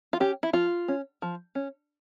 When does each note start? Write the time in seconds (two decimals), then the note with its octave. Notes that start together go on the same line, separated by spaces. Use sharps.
0.13 F4
0.20 C#4 G4
0.43 E4
0.53 F3 F4
0.88 C#4
1.22 F3
1.55 C#4